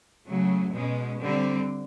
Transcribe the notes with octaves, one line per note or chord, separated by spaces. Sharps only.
C#3 F#3 A3
B2 G#3 C#4
D3 G3 C4